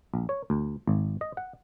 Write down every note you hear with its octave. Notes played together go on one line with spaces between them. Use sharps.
A#1
C#5
D2
G#1
D#5
F#5